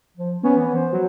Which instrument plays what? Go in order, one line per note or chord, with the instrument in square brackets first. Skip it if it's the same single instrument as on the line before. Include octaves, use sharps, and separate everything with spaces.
[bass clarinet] F3
[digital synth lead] B3 [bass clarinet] C#4
[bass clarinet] E3
C5
[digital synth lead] F#3